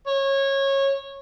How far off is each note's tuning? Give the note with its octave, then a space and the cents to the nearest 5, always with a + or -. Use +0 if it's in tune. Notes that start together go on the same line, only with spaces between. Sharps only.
C#5 -20